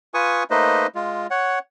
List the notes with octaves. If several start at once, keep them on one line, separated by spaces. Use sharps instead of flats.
F4 B4 G#5 C#6 D#6
A3 A#3 D#4 B4 C5 D#5
G#3 F4
C#5 F#5